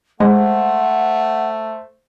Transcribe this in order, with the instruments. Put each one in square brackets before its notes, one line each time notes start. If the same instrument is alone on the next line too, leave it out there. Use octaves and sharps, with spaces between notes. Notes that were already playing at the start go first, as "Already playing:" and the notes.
[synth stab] G#3 [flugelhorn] A3 [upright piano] C5 [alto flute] F#5